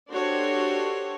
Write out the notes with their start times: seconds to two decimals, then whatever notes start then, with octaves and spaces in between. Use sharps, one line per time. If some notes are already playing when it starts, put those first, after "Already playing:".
0.12 D4 F#4 G4 A4 C5 C#5